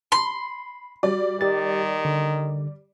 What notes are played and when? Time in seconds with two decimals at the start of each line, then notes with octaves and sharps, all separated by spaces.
0.12 B5 C6
1.03 G3 F#4 D5
1.41 D#3 G4 A6
2.05 D3